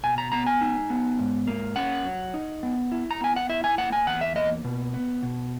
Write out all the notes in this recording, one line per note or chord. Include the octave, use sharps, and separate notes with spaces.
B2 G#5
A#5
B3 A#5
G#5
D#4
B3
G#2
A#3
C#4 F#5
F#3
D#4
B3
E4
A#5
B3 G#5
F#5
E4 E5
G#5
A#3 F#5
G#5
E2 F#5
E5
A#3 D#5
B2
B3
B2